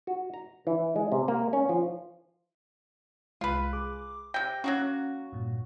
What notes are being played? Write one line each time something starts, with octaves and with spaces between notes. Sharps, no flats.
F#4
A#5
E3
G#3
C3
A#3
C#4
F3
C2 G#3 F4 B4
G#4 D6
C3 G5 A#6
F#3 A#3 C#4 F#4
G2 A#2